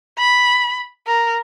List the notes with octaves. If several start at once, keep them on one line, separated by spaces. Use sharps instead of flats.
B5
A#4